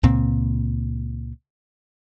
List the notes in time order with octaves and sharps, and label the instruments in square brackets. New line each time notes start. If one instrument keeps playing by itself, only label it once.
[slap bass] C#2 A#2 C4